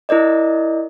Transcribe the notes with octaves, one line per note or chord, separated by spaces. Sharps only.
E4 A#4 D5 D#5